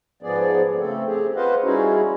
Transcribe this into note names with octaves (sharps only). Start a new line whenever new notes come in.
G#2 F3 B3 G#4 D5
C#3 A3 C4 A4
C4 G4 G#4
F4 B4 C5 D#5 F5 F#5
G3 C#4 D#4 E4 F#4 G#4